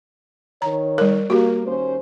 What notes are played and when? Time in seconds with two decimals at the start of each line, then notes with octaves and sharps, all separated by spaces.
0.62 D#3 C#5 A#5
0.98 G3 A#4
1.30 A#3 F#4 G4
1.65 D#2 C#4 C5